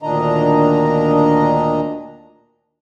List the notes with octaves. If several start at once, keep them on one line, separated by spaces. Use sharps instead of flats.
D2 A#2 D#3 D4 D#5 A#5